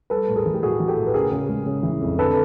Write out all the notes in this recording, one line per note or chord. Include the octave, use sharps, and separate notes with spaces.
G3 A4 B4
A2
G#4 A#4
E3
G4
A2 F#4 G#4
E3
G4 A4
A2
B4
C#3 G#4 A#4
C#3
G#3
C#3
E3
F2
D3 A4 B4